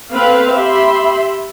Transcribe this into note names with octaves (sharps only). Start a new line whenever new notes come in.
C4 A4 B4 F5
G4 E5 B5 C6